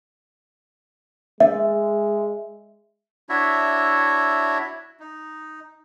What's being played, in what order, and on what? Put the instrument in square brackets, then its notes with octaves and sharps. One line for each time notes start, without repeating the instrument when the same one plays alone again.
[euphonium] G#3 [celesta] E5
[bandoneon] D4 E4 F#4 C#5 E5
D#4